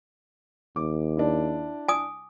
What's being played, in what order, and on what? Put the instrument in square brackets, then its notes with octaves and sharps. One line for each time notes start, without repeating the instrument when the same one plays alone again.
[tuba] D#2 [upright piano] D6
[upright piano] D4 E4
[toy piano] G#5 D#6